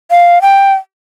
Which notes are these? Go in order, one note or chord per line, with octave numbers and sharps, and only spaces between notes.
F5
G5